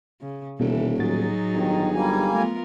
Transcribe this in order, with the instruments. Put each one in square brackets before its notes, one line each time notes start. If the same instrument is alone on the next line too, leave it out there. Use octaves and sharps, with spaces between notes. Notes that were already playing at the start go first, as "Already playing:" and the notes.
[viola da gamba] C#3
[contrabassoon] D#1 [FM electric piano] B2 [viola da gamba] E3 A4
[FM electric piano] A2 F#4 A6 [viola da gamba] F#3 D#4 G#4
[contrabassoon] G1 [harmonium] D#3
[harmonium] G3 A#3 G#5 [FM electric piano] F#4
[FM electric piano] A3 [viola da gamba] B3 F4 A#4